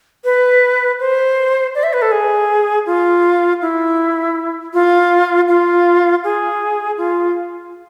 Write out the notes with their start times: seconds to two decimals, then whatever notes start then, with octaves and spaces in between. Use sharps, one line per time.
0.24 B4
1.00 C5
1.75 D5
1.83 E5
1.93 B4
2.02 A4
2.12 G#4
2.86 F4
3.62 E4
4.74 F4
5.48 F4
6.24 G#4
6.98 F4